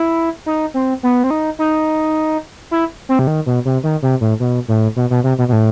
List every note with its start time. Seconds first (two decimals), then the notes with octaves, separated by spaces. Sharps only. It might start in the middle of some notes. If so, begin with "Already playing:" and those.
Already playing: E4
0.46 D#4
0.74 C4
1.03 B3
1.24 C4
1.30 D#4
1.59 D#4
2.71 E4
3.09 C4
3.19 C3
3.27 D#3
3.46 B2
3.65 C3
3.83 D#3
4.02 C3
4.21 A2
4.40 B2
4.68 A2
4.96 B2
5.10 B2
5.24 C3
5.38 B2
5.48 B2
5.53 A2